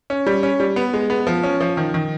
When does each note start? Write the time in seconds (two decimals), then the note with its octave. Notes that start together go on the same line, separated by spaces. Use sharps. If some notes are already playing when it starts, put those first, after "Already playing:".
0.10 C#4
0.27 G3
0.43 C#4
0.60 G3
0.76 B3
0.94 G#3
1.10 B3
1.27 F3
1.43 C#4
1.60 F3
1.77 D#3
1.94 D#3